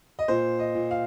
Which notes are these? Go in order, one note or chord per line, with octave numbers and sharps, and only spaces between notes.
D#5
A#2 C5
D#5
A#2
F5